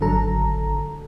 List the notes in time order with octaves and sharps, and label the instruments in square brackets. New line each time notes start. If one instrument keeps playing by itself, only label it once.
[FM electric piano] G#1 D3 F#3 A4 A#5